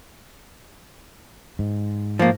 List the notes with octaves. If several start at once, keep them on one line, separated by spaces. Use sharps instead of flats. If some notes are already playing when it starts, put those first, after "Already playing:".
G#2
F3 A#3